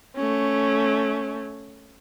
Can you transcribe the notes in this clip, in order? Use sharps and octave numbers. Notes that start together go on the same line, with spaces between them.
A3 C#4